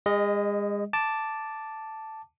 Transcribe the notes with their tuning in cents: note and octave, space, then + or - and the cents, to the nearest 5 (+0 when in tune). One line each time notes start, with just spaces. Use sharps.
G#3 -35 D#5 +0
A5 +0 D6 +0